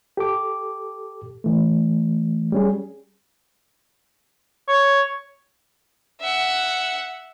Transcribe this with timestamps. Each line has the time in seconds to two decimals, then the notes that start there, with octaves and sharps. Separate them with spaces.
0.17 G4 A4 D6
1.44 E3 A3
2.52 G3 C#4 G#4
4.68 C#5
6.20 E5 F#5